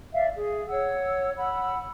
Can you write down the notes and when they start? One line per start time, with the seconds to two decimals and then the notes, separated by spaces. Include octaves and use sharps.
0.13 D5 E5 F5
0.35 G#4
0.68 C#5 F#5 E6
1.36 F#5 B5 E6